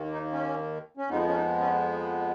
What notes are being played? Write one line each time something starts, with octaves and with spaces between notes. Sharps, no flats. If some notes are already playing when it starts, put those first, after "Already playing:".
Already playing: D#2 D#3 A#3
D#4
C#4
C#4
F2 F3 G#3 B3 D#4
C#4
D#4
C#4